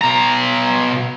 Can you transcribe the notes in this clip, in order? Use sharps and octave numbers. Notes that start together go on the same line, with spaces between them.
B2 A#5